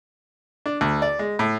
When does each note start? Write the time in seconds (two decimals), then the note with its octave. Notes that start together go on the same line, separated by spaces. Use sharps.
0.66 D4
0.81 D2
1.02 D5
1.19 G#3
1.39 A2